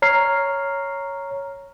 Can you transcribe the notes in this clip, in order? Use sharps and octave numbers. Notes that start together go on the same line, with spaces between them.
C#5 A#5 F6 C7